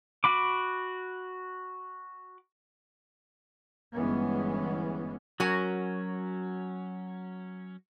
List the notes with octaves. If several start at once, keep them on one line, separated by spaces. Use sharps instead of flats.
F#4 B5 D6
G1 E3 G#3 B3 C#4
F#3 C#4 F#4 A#4 G#5